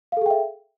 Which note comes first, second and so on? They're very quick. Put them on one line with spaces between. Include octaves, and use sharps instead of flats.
F5 A4 G#4 G5 E5